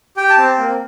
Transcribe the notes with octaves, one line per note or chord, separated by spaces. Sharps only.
G4 G5
A5
C4
A#3